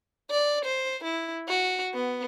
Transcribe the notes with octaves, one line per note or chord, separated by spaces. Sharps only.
D5
C5
E4
F#4
B3